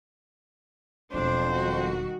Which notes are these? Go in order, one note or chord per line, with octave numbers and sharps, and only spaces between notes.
E1 F2 F#3 C#4 D4 C5
D#3 G3 F#4